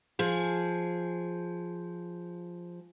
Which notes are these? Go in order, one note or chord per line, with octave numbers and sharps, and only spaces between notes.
F3 G#4